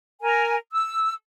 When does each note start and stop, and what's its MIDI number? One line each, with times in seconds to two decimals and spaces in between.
0.21 0.56 70
0.21 0.56 80
0.71 1.13 88